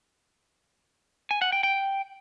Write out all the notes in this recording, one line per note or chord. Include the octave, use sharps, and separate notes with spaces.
G#5
F#5
G5
G5